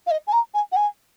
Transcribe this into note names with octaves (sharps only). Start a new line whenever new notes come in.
F5
D#5
G#5
A#5
G#5
F#5
G#5